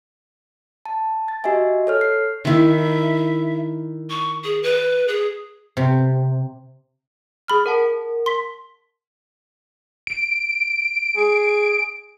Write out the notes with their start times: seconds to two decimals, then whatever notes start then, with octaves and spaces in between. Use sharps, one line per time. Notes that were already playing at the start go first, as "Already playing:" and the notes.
0.85 A5
1.28 A6
1.44 F#4 G4 D#5 E5 G#5
1.87 A4 C#5 F6
2.01 C7
2.45 D#3 E4 E5
4.10 C#6
4.44 G#4
4.63 B4
5.08 G#4
5.77 C3
7.48 G#4 B5 F6
7.66 A#4 F#5 A5
8.26 C6 B6
10.07 D7
11.16 G#4